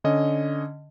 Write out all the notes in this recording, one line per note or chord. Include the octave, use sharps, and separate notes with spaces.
D3 C#4 D#5